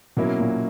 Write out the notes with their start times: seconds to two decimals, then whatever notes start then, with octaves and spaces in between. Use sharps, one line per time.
0.17 B2 F#3 A#3 C#4 E4
0.40 A#2